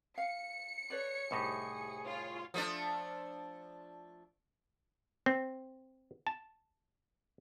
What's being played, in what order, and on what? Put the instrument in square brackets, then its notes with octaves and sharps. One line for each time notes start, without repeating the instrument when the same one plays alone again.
[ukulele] F5 [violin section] C#7
[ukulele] A4 B4 D5 [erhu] C#5
[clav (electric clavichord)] C2 A2 D#4 [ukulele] G4 C5 [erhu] G#4
[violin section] F4 C#5
[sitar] F3 A3 D4
[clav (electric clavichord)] C4
A5